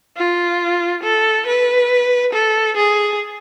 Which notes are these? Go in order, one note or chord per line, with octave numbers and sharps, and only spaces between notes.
F4
A4
B4
A4
G#4